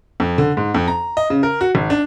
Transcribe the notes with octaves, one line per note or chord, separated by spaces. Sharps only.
F2
D3
G#2
F2
A#5
D#5
C#3
A#4
F#4
G#1
D4